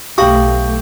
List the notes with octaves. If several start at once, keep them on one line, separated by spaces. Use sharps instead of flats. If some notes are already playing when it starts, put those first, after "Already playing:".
B1 A3 G4 F5 G5 C#6 D#6